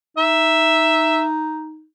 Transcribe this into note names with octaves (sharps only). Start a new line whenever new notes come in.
D#4 E5